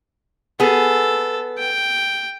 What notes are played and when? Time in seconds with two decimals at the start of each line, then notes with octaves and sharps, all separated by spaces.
0.60 B3 G#4 A4
1.58 G5